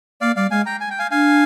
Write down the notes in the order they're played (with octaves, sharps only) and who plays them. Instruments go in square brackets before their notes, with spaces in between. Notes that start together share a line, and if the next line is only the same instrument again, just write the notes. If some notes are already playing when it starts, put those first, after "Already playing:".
[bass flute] A#3 [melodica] D5 F5
[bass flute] G3 [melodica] D5 F5
[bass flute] G#3 [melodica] F5 G#5
[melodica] G5 A#5
G#5
G5
F5 G#5
[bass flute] D4 [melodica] F5 G#5